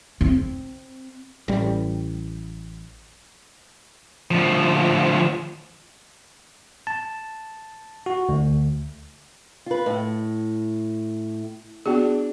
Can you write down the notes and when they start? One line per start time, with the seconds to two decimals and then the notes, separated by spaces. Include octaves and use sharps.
0.21 C4
1.48 A1 G3
4.31 D2 F3
6.87 A5
8.06 F#4
8.29 D2
9.66 F4 B4
9.86 A2
11.86 B3 D4 F#4 G#4